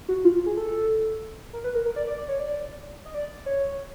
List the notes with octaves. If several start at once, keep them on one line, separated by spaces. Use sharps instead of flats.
F#4
F4
G#4
A4
A#4
B4
A#4
A#4
D5
D5
D5
C#5
D5
D#5
D5
C#5